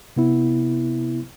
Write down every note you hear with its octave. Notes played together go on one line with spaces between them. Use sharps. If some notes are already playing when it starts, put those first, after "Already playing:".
C3 B3 E4